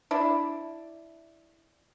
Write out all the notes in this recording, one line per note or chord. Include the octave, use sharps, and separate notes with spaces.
D4 E4